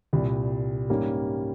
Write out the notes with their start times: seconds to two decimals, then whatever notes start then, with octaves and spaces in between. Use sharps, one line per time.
0.13 C2 A#2 G3
0.90 G#2 G3 A#3 C#4